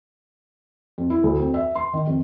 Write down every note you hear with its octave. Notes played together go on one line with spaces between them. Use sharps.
F2
E4
D2
C4
E5
C6
D#3
F2